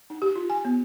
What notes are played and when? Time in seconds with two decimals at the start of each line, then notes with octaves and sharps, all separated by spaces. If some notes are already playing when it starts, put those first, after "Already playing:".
0.10 D#4
0.22 G4
0.36 F4
0.50 G#5
0.65 B3